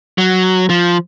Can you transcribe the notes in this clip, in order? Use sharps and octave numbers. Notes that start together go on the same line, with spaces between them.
F#3
F3